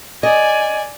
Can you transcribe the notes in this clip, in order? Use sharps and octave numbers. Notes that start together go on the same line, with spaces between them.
D5 D#5 G#5